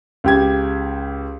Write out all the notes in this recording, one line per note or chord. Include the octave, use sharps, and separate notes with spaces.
C#2 G4 G#6